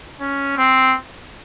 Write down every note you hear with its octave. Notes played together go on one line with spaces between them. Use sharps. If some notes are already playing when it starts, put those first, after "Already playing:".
C#4
C4